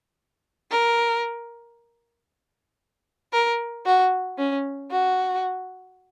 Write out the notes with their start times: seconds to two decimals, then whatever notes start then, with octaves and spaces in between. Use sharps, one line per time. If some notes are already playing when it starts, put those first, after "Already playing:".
0.71 A#4
3.33 A#4
3.86 F#4
4.38 C#4
4.91 F#4